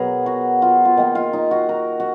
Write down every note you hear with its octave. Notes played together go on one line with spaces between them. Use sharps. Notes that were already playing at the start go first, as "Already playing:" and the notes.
Already playing: B2 F#3 B3 G#4 A#4
F#4
F4
F4
D#3 A#3 D#4
F4
D#4
F#4
A#4
F#4